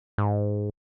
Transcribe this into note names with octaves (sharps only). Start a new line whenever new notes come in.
G#2